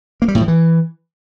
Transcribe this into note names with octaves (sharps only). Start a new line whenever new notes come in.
A#3
G3
A2
F3
E3